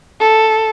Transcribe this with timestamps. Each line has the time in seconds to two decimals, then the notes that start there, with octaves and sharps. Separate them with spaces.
0.20 A4